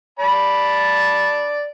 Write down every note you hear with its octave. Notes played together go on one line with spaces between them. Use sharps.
D5 A5 B5